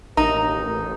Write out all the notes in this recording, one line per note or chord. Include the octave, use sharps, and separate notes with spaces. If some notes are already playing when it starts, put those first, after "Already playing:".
A1 D#2 B2 D#4 A#4 A#5